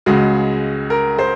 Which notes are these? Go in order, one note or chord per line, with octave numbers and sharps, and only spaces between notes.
C#2 C#3 G#3 F#4
A#4
C5